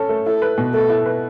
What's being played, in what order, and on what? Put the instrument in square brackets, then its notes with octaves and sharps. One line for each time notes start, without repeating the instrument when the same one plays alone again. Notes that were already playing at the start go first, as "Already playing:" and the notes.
Already playing: [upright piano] C#4 A4
A3
[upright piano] E4 [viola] A4
[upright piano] B4
B2
[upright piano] A3 [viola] A4
[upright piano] E4
B4